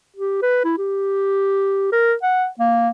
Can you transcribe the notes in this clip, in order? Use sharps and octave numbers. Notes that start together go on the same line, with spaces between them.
G4
B4
E4
G4
A#4
F#5
A#3